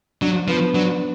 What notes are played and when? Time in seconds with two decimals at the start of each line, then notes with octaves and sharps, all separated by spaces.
0.21 F#3 D4
0.48 F3 B3
0.74 F#3 D4